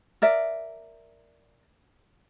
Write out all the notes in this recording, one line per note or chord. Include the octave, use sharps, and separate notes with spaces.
A#4 D5 E5